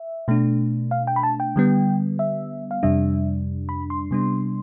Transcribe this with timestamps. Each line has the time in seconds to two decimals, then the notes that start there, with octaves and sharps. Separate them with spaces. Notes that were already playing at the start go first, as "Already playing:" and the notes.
Already playing: E5
0.28 B2 A3 D4
0.91 F5
1.07 G5
1.16 B5
1.23 A5
1.40 G5
1.56 D3 G3 B3
2.19 E5
2.71 F5
2.83 F2 C3 G3 D4 E5
3.69 B5
3.90 C6
4.11 C3 G3 B3 D4